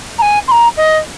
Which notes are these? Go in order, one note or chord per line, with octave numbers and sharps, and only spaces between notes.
A#5
G#5
C6
A#5
D#5